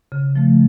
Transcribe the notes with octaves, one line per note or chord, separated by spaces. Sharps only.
C#3
F3 A3